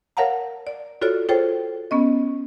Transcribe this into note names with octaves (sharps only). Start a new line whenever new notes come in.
A#4 C#5 F5 F#5 A5 A#5
D5
F4 F#4 A4 C#5 D5
F4 G#4 A4 C5 C#5 G5
B3 C#4 D#5